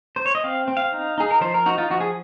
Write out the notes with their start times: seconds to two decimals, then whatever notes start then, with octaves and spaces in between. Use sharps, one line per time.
0.16 C5
0.26 C#5
0.35 D#5
0.44 C4 F5
0.68 C4
0.77 F5
0.92 D#4
1.18 D#4 G#4
1.31 A#4
1.41 F3 C5
1.54 A#4
1.66 D#4 F#4
1.78 F4
1.90 F3 F#4
2.00 G#4